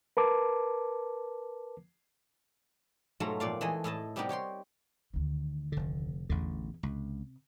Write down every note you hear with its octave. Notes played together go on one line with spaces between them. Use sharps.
A#4 B4 A5 D6
G#2 B2 F#3 A3 F4 A#5
F2 A#2 D5 F5
E3 G#3 A3 D#5 G#5
A2 E4 D#5 A5
C3 G3 B3 D#4 G4 A#4
G4 C#5 G5 C6
D2 D#3
F1 D3
A1 E2 B2 D3
C#2 C3